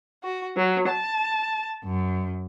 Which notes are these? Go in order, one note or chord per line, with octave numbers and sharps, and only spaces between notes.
F#4
F#3
A5
F#2